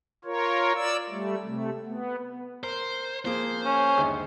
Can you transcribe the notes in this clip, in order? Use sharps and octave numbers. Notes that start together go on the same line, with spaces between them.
F4 A#4 C#5
D5 E6
G3 A3
C3 A3
B3
A#4 C5
F3 A#3 G#4 C5
C#4
G1 D#2 G#3